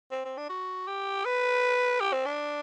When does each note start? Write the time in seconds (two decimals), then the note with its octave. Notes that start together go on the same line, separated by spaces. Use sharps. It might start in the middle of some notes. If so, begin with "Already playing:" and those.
0.12 C4
0.25 C4
0.37 D4
0.50 F#4
0.87 G4
1.25 B4
2.01 G4
2.13 C4
2.26 D4